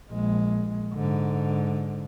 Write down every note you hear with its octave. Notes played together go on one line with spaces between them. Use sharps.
A#1 G#3
G#2 D3